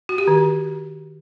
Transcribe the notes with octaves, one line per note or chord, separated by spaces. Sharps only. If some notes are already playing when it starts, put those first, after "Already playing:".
F#4
G4
D#3